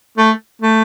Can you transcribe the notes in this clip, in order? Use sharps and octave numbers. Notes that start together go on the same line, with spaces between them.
A3
A3